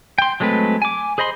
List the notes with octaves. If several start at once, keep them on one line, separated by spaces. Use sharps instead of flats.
G5 C6
F#3 G#3 A3 C4 B4
G#5 D6
G#4 C5 D#5 B5 C6